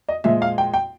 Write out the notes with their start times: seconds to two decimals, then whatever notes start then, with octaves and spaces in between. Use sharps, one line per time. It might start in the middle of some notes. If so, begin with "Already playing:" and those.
0.09 D#5
0.24 A#2 F3 G#3 E5
0.42 F5
0.58 G5
0.74 G5